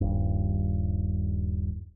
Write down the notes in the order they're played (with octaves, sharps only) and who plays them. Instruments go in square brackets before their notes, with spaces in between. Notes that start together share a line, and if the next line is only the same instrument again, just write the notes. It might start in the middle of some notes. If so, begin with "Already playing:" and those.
[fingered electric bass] D#1 G2